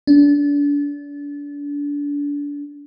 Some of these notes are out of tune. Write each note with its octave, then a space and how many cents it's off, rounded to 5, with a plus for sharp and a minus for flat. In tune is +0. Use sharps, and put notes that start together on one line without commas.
D4 -30